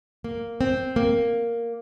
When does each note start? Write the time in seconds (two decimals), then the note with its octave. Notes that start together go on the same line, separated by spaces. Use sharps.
0.24 A#3
0.61 C4
0.96 A#3